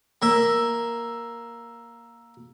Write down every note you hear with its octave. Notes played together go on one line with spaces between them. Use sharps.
A#3 E5